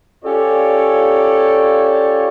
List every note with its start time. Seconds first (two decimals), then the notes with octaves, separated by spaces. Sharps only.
0.24 C#4 F4 G4 A4 C#5 D5